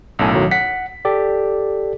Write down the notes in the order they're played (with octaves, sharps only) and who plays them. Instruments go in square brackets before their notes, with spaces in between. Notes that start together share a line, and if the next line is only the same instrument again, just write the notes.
[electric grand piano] B1 F#2 A2 [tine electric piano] G#5 A5 E6
[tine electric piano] D#3 F#3
[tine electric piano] F#5 [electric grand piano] B6
[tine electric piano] G4 A4 D5